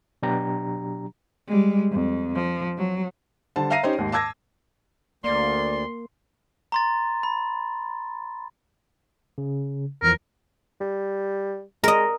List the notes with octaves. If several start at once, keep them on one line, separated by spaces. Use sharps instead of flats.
B2 F#3 D4 G4 A#5
G3 G#3
F2
F3
F#3
D3 G3 C5 A5
E5 F5 A#5 A#6 C7 D#7
C#4 D#4 G4 C5 C#5
D#2 G#2
A5 D6 E6 G#6 A#6
D2 A#3 D5 C6
A#5 C6 A6
B5
C#3
E2 E3 F3 A#4
G3
G#3 A#4 D#5